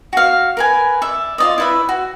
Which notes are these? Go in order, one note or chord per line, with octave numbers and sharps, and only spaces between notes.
F#4 F5
A#4 B4 G#5
D5 E5
F4 D5 D#5
E4 B4 E5
F#4